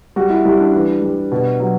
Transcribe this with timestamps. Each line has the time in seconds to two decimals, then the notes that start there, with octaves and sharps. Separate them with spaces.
0.16 G3 F#4
0.30 E4
0.45 G3 E4
0.60 D4
0.74 E3
1.02 G3
1.32 B2
1.60 F#3